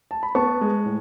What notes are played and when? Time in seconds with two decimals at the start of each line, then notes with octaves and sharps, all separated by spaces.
0.11 A5
0.23 B5
0.35 B3 A5 C#6
0.61 G#3
0.85 A2